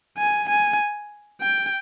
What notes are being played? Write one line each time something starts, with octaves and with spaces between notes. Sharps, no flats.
G#5
G#5
G5